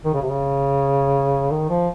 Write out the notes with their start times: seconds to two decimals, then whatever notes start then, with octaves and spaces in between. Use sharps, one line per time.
0.05 D#3
0.14 C#3
0.22 C3
0.30 C#3
1.51 D#3
1.70 F3